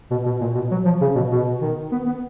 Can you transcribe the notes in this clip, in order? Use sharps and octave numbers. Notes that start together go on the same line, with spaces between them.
B2
B2
A#2
B2
F#3
F3
C#3
B2
B2
D#3
B3
B3